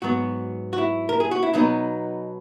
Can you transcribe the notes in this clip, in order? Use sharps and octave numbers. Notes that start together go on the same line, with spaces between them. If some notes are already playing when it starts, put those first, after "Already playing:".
G#2 F#3 B3 F#4
F#4
E4
A#4
G#4
F#4
E4
B2 F#3 B3 D#4